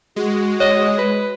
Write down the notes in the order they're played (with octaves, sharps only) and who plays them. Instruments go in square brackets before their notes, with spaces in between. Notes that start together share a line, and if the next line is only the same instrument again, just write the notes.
[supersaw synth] G#3 [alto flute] F#4
[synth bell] C#5 [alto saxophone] D#5
[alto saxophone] B4